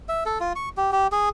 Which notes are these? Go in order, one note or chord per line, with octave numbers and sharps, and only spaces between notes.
E5
A4
F4
C#6
G4
G4
G#4